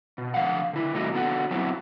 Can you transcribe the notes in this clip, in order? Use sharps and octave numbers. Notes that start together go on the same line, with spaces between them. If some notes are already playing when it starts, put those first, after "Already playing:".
B2
D3 F3 F5 F#5
D3 E4
C3 E3 G3 A3 D#4 F#4
D3 B3 F#4 A4 F#5
F#3 B3 C4 E4 F#4